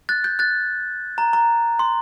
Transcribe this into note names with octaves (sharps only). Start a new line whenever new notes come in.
F#6 A6
G6
F#6 A6
A#5
A#5
C6